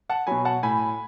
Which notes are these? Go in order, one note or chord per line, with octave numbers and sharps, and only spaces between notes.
F#5 A5
B2 F#3 G#5 B5
F#5 A5
A2 G#5 B5